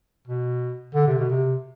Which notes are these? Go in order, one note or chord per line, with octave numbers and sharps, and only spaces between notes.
B2
D3
C3
B2
C3